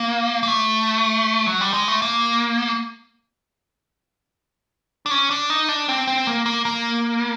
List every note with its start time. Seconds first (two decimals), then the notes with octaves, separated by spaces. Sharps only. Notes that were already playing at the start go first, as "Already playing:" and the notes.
Already playing: A#3
0.43 A#3
0.48 A3
1.46 F#3
1.61 G3
1.74 G#3
1.88 A3
2.02 A#3
5.06 D4
5.11 C#4
5.31 D4
5.50 D#4
5.68 D4
5.89 C4
6.07 C4
6.27 A#3
6.46 A#3
6.65 A#3